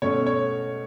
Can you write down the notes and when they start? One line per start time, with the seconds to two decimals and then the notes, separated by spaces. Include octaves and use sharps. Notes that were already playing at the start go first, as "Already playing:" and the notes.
0.02 B2 A3 C#4 C#5
0.26 C#5